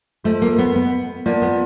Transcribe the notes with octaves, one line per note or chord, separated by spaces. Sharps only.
A3 F4 A4 C5 D#5
A#3
B3
B3
A#3 F4 A#4 D5 F#5 A5
B3